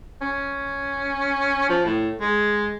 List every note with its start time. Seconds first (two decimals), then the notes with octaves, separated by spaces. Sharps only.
0.21 C#4
1.69 F3
1.85 A2
2.21 G#3